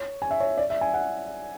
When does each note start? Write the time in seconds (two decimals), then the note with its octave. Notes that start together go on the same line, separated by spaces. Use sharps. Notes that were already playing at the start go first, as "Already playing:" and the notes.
Already playing: C#5
0.22 G#5
0.31 E5
0.40 C#5
0.57 D5
0.70 E5
0.81 G#5
0.94 F#5